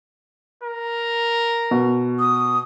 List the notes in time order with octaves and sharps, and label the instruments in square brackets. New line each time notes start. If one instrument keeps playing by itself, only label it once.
[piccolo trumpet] A#4
[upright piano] B2
[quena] D#6